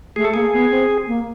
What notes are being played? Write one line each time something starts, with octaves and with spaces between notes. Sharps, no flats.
A3 G#4
A4
A#3 G#4
B3
C4
A#3